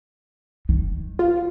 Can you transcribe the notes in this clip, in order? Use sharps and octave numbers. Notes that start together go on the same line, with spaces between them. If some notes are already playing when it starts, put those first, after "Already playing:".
D#3
F4